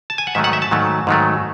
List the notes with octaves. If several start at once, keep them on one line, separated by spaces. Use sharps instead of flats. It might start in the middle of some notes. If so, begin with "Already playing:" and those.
A5
G#5
F#5
G#2 D#3 F#3 A3 E5
F#5
E5
A5
G#2 D#3 F#3 A3
G#2 D#3 F#3 A3